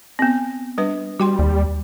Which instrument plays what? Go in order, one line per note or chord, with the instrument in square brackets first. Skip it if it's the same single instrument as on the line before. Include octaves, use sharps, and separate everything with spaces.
[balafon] B3 C4
G3 D4 B4
[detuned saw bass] G3 [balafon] F#4 G5 C6
[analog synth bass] D#2